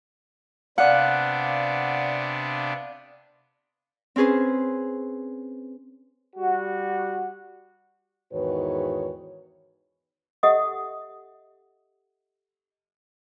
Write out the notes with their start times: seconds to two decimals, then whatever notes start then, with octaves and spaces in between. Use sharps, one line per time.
0.78 C3 B3 D4 D5 F5 F#5
4.16 C4 C#4 G#4 B4 C5
6.36 G3 F#4
8.33 E2 G#2 D#3 F#4 B4 C#5
10.43 G4 A4 D#5 E5 F#5 D#6